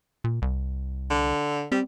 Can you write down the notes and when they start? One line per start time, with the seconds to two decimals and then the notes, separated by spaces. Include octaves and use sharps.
0.24 A#2
0.42 C2
1.10 D3
1.72 G3 C4